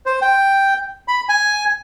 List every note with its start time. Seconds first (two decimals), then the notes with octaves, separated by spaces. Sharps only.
0.06 C5
0.22 G5
1.08 B5
1.29 G#5